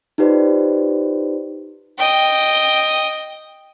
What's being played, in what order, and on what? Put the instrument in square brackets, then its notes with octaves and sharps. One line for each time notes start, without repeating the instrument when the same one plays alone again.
[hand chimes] D#4 F4 G4 B4 C5 D5
[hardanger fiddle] D#5 G5